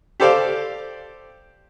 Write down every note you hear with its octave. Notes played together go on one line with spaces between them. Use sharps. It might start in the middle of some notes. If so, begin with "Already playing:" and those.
G4 A4 C5 D5 F5